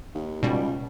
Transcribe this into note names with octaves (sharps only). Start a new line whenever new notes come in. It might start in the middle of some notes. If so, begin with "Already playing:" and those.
D#2
C#2 B2 G3